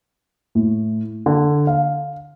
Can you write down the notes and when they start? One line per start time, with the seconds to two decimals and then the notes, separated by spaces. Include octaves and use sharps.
0.55 A2
1.26 D3
1.67 F5